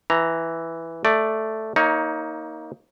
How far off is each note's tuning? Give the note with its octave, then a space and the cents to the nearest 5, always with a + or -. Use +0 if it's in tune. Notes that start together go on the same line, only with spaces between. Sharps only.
E3 +0 A#5 +0
A3 +0 D5 +0
A#3 +0 D#4 +20 C#5 +0